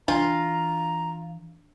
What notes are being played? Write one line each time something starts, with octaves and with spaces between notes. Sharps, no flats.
E3 D4 F4 A#5